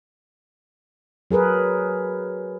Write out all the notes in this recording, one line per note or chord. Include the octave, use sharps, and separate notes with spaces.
F#3 G#4 A#4 B4